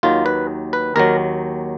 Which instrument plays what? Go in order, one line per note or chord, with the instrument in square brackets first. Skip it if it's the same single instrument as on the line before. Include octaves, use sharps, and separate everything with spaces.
[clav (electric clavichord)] D#2 D#3 F#3 F4
B4
B4
D#2 D#3 F#3 A#4